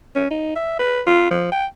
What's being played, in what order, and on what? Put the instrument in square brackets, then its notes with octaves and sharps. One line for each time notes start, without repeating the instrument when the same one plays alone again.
[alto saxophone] C#4
D#4
E5
B4
F4
F3
G5